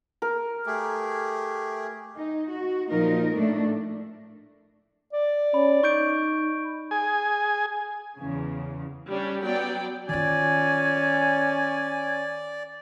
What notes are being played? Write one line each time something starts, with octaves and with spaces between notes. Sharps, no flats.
A#4
A3 G4 G#4
D#4
F#4
A#2 F3 D#4 A#4
A2 A3 D4
D5
C#4 B5
D#4 C#6 G6 D7
G#4 G#5
E2 C#3
G3 C#4 D4 G4
F#3 B3 D5 G5
D#3 C#4 F4 D5 G#5